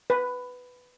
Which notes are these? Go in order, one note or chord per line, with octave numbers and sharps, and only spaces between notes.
B4